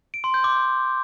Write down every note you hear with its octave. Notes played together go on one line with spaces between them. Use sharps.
D7
C6
G6
D6